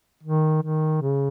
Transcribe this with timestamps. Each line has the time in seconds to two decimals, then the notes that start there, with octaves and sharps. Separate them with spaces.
0.23 D#3
0.62 D#3
1.01 C#3